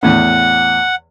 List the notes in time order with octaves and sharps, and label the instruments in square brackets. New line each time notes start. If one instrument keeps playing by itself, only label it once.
[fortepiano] E2 A2 [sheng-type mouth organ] F#5